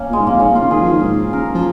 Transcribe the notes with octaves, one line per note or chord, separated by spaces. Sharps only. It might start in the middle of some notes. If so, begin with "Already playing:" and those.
Already playing: A#3 C#4
A#2 G#3
G#2
F2 A#3
G#2 C#4
A#2
F4
C#3
D#3 G#4
F3
D#3
G#2
C#3 A#4
F3